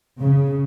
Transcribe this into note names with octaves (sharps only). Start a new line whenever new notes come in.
C#3